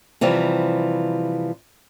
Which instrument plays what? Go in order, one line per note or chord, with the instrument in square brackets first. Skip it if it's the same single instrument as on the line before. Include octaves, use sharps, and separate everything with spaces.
[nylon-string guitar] C3 E3 F3 G3